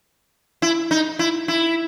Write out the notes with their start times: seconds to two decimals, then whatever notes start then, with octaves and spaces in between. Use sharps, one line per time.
0.62 E4
0.91 D#4
1.19 E4
1.48 E4